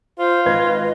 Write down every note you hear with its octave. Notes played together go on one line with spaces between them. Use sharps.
F4 C5
G#1 B4 D#5 G#6